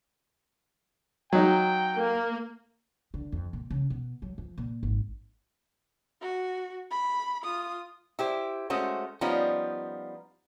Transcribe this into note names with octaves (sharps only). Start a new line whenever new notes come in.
F#3 D#4 G5
A#3
D3
F2
A#2
C#3
B2
F#3
F3
A#2
G#1
F#4
B5
F4 D#6
E4 G4 C5
G#3 A3 C#4 F#4 C5
F3 G3 B3 C#4 D#4 F4